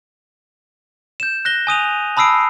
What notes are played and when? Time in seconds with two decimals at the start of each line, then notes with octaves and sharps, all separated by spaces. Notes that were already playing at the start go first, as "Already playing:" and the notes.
1.20 G6 E7
1.45 F#6 A#6 G7
1.67 G#5 D#6 D#7 F7
2.17 A5 B5 D#6 E6 C7 D7